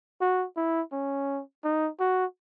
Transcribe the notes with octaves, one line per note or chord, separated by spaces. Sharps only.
F#4
E4
C#4
D#4
F#4